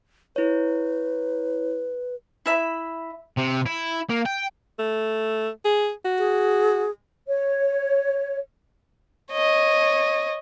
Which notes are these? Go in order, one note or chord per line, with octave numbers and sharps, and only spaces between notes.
E4 B4 C#5
E4 E5 B5
C3
E4
A#3
G5
A3
G#4
F#4
G#4
C#5
C#5 D#5